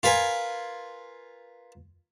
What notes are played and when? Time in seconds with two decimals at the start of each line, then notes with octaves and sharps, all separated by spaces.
0.03 F4 A#4 B4 G#5